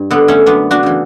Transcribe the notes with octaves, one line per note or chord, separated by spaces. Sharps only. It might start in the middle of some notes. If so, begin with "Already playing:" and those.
Already playing: G2
D3 B3
A3 C#4
F#2 B3 D4
D4 F#4
C#3 E3